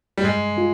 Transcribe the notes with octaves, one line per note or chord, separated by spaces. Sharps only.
G3
G2 G#3
F4